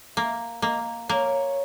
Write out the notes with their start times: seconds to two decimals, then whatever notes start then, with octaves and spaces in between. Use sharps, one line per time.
0.16 A#3 E5
0.62 A#3 D#5
1.09 A#3 C#5